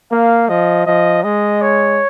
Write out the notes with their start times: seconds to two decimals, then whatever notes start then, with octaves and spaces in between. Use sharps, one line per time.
0.11 A#3 F5
0.48 F3 D#5
0.86 F3 D#5
1.23 G#3 D#5
1.62 C#5